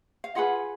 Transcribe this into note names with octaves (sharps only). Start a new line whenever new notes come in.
F5
F4 G#4 B4 D#5 F#5